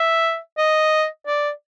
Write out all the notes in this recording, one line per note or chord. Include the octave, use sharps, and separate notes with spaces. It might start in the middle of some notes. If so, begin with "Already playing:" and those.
Already playing: E5
D#5
D5